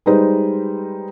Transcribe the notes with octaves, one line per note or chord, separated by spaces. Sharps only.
G3 G#3 D#4 B4 C5 D#5